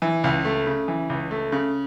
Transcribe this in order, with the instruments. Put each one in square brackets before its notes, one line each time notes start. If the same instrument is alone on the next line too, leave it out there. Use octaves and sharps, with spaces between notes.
[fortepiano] E3
C#2
A3
C#3
E3
C#2
A3
C#3